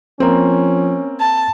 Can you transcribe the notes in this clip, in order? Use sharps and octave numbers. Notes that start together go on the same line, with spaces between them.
F3 A#3 C4 C#4
A5